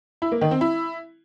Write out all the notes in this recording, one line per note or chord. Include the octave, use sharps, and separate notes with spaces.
E4
A#3
D#3
C4
E4